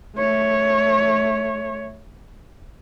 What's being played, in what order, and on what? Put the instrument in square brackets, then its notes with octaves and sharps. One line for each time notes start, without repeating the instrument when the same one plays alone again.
[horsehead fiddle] A3 C#5